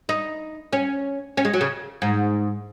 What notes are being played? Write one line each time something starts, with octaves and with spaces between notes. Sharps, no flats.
D#4
C#4
C#4
G#3
F#3
C#3
G#2